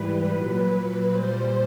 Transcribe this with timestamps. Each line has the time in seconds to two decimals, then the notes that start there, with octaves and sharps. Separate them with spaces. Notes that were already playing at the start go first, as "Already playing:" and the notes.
Already playing: G#2 E3 G3 B4
0.31 A#2 F#3 B4
1.10 A#2 G3 C5